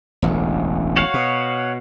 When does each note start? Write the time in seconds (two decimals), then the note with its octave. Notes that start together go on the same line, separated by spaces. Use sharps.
0.22 E1 A1 D2
0.96 F#4 C#5 F5
1.14 B2